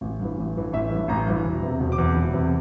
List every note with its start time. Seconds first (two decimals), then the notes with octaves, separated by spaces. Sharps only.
0.01 A1
0.19 G2 E3
0.38 A1
0.56 G2 E3
0.73 A1 E5
0.91 G2 E3
1.08 A1 A#5
1.26 G2 E3
1.44 E1
1.62 E2 C3
1.80 E1
1.92 D6
1.98 E2 C3
2.16 E1
2.34 E2 C3